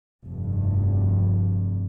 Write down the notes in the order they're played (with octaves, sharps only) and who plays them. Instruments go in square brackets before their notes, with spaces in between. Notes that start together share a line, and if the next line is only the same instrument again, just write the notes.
[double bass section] F1 G2